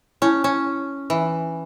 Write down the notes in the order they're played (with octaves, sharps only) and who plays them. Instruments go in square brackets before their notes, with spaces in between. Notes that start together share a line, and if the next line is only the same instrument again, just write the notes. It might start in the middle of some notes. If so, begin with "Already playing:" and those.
[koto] C#4 [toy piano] E4 C#5 A5
[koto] C#4
E3